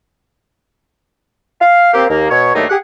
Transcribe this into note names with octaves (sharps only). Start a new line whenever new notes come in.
F5
A#3 C4 G4
D#2 A#3
B2 C#5
G2 D#3 F#3 A3 A#3 D#4
G4 G#4 F#5